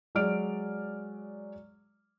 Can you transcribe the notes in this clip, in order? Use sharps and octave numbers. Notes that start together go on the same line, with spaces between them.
F#3 G#3 D5 F6 D7